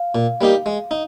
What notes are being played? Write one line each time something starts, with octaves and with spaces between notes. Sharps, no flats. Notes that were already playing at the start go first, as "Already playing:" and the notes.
Already playing: F5
A#2
G3 A#3 D#4 G4
G#3
D#4